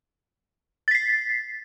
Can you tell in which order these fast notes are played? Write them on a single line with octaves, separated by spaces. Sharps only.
A6 B6 C7